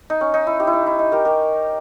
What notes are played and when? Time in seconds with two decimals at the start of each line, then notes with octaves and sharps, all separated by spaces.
0.10 D#4
0.21 C#4
0.34 D#4
0.47 E4
0.60 D#4 G4
0.67 E4
0.73 D#4
0.86 E4
0.99 D#4
1.12 G4 A#4
1.25 G4 A#4